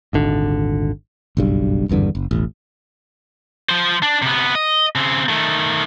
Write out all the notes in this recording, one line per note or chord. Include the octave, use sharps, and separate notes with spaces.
D#1 G#1 D3
F#1 B1 G2
G#1 E2 G2 D3
F#1
E1 A1
F3 C5
D4
C3 B3
D#5
C#3 C4
D#3 A3